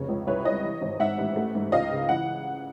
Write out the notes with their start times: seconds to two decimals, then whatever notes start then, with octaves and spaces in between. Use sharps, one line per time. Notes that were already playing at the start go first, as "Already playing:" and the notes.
Already playing: F1 C#3 C#5
0.09 C#2
0.27 C2 B4 C#5
0.45 G3 C#5 D#5
0.63 E3
0.82 G#1
0.99 G#2 E5 F#5
1.18 A1
1.36 A3
1.55 G#2
1.72 C#2 D#5 F5
1.91 C#3
2.09 E3 F#5